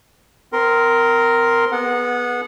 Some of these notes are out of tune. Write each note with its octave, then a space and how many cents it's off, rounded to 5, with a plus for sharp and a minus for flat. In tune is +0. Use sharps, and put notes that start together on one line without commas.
C4 -35 A#4 +0 C6 +0
B3 -10 G#4 +35 F#5 -20